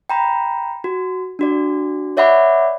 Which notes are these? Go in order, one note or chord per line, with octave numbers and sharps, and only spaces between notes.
G5 A#5 B5
F#4
D4 F#4 D5
C#5 D5 E5 F#5 B5 D6